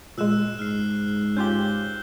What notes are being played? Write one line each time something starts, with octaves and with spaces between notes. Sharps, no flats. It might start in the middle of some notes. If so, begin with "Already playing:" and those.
A#2 G#3 E6 F#6 E7
G#2 F6 C7
C#4 F4 G4 G6 G7